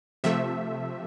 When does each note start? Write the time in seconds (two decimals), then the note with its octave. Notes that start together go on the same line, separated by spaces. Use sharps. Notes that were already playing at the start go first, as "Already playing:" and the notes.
0.24 C3 F3 A3 E5